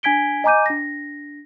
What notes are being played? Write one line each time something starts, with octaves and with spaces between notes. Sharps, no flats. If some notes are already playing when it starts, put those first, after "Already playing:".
D4 G#5 G#6 B6 D7 G7
D#5 G#5 A#5 D6 G6 D#7
D4 A#6